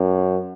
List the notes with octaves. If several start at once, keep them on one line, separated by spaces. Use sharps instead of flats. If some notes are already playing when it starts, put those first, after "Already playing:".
Already playing: F#2